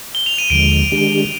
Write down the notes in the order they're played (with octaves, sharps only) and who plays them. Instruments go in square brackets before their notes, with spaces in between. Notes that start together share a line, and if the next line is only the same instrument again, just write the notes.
[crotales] G7
F7
D#7
[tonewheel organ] D#2 D3 F3 G#3 [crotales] D7
[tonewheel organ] D#3 G#3 D4 G4